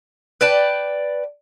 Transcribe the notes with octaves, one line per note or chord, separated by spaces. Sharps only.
B4 D5 G5 A5